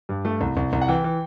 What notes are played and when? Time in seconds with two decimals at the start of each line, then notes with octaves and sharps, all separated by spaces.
0.09 G2
0.25 A3
0.41 C2
0.57 C2
0.73 C2
0.81 F#5
0.88 E3 G5
1.04 E3